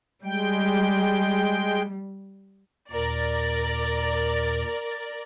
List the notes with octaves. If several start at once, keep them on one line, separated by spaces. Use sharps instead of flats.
G3 G#3 G5
D#2 A#2 A#4 D5